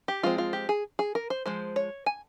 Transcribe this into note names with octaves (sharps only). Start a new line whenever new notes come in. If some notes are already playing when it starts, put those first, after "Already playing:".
G4
F3 G#3 C4 F4
F4
G4
G#4
G#4
A#4
C5
F3 G#3 C5
C#5
G#5